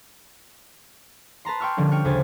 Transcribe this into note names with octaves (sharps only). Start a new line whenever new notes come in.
B4 A5 A#5 C6
G5 C6 C#6 E6 F6
D3 F3 G3 C#4
G5 C#6 F6
D2 C#3 C5 G#5 A6